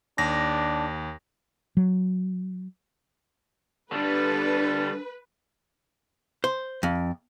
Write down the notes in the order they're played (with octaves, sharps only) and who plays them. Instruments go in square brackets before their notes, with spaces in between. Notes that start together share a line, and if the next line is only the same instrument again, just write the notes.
[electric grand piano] D#2 A#6 [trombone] D4
[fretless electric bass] F#3
[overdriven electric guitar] D3 G3 [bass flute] D4 [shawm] A4 [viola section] B4
[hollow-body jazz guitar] C5
F2